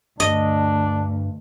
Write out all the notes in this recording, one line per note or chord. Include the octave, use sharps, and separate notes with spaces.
D2 G2 D4 D#5